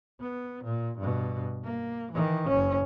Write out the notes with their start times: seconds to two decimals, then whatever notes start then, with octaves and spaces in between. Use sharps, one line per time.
0.20 B3
0.64 A#2
0.98 G2 B2
1.64 A#3
2.12 D#3 E3
2.48 F#1 C#4